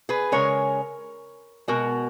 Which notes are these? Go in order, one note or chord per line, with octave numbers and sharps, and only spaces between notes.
G#4 B4
C#3 G#3 A#4 C#5
B2 G#3 F#4 A#4